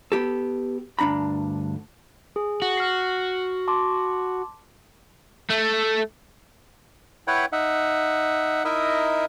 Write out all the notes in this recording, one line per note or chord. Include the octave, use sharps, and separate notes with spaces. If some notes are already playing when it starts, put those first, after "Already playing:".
B3 G4 A4
D2 G2 D4 A#5 B5
G#4
F#4
F6 C7
A5 C6 D6
A3
E4 B4 C#5 F#5 G5
D#4 E5 F#5
D#4 E4 A#4 D#5 E5